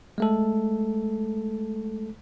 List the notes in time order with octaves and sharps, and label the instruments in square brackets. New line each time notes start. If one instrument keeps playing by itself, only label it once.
[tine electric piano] G#3 A3 A4